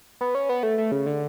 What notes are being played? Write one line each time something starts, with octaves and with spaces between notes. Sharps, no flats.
B3
C#4
B3
A3
A3
C#3
D3